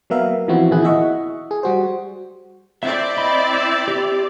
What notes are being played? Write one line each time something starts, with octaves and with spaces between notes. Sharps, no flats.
F#3 A#3 B3 A#4 E5 F5
E3 F3 B3 C4 E4 F#4
A#2 D#3 E3 E4 G#4 F#6
E4 D#5 E5 F#5 C#6
G#4
G3 F#4 C5
C4 E4 D5 E5
D#5 B5
E6
G4